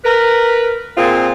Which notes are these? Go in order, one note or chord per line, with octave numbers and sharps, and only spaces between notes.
A#4 B4
A#2 C4 F4 G#4